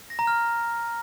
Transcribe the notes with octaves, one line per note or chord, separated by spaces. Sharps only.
A#6
A#5
F6